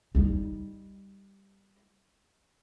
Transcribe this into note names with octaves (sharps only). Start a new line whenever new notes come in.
G3 D#4